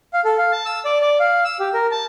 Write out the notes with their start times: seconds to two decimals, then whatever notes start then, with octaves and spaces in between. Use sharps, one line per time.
0.13 F5
0.25 A4
0.38 F5
0.52 A5
0.66 E6
0.85 D5
1.02 D5
1.20 F5
1.45 E6
1.60 G4
1.74 A#4
1.91 A5